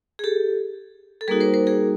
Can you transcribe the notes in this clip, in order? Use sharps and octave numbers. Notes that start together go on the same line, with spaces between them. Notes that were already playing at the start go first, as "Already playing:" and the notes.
G#4
G4 A4
A4
G3 A#3 D#4 F#4 G#4 A#4
A#4 C5
A#4 C5
G#4 A#4